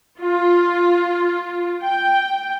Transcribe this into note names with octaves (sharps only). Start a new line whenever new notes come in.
F4
G5